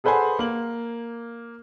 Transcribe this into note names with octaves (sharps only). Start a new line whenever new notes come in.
G#4 A4 B4 C5 F#5 G#5
A#3 F#7